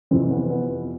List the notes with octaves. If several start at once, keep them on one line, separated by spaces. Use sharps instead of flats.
F2 C3 E3 C4
B3
B3